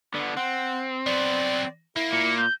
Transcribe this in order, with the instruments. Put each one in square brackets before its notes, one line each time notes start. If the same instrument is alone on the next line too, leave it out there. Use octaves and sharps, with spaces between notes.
[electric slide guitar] D3 B3 [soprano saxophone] D4
[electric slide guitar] C4 [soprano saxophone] F#5
[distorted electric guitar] F#3 B3 [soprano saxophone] D5
[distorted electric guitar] A#3 [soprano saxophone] E4
[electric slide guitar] A#2 [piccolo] C#7
[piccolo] G6